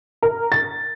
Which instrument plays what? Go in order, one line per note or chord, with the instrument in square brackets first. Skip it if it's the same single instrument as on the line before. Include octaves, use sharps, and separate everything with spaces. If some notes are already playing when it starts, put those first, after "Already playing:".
[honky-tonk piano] A#4
A6